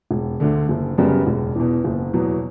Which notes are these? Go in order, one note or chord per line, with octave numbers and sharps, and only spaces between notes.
E1
D2 D3
F#1
F#2 C#3 G3 B3
E1
E2 B2
F#1
E2 B2 F#3 B3